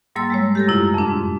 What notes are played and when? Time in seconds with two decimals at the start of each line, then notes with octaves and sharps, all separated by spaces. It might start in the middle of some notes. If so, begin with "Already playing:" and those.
0.16 G#2 G3 A#3 C6 E6 A6
0.30 G#3 A3 C#5
0.55 G4 A4 A#6
0.67 F#2 C3 E4 F4
0.94 F2 D4
1.08 G#2